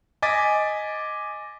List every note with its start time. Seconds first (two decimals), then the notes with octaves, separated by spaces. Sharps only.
0.22 D#5 G#5 D6 A6 B6